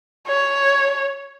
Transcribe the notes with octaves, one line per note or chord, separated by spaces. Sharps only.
C#5